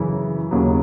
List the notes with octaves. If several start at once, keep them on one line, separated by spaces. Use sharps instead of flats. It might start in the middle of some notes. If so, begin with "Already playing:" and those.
Already playing: F#2 C#3 E3 E4
D#2 C#3 F#3